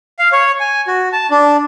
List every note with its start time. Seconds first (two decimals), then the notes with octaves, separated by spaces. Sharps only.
0.19 F5
0.32 C#5
0.60 G#5
0.87 F#4
1.12 A5
1.30 D4